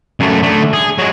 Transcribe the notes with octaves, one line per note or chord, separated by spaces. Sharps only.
F#2 A3
D3 A3
G#4
F#3 G#3